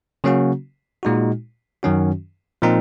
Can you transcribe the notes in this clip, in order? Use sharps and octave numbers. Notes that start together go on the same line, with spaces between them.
C#3 F#3 A#3 C#4 F#4
A#2 G#3 D#4 F#4
F#2 D#3 F#3 C#4 F#4
A#2 F3 C4 D#4 A#4